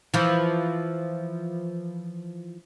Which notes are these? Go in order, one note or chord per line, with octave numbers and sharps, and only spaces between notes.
E3 F3